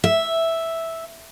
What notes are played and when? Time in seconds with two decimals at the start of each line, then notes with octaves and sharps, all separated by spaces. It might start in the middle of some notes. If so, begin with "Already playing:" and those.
0.04 E5